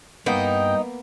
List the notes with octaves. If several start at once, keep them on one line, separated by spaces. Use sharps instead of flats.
G2 A#3 B3 D#4 G5